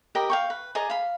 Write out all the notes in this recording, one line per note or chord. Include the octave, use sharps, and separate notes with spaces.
G4 A#4 D#5 B5
F5 G5 C#6
B4
G#4 D5 D#5 A#5
F5 B5